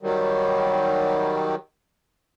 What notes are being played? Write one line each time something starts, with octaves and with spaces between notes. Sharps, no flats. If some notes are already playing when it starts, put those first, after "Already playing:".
D#3 F#3 G3